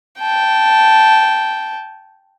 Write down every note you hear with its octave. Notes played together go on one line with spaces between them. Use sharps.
G5 A5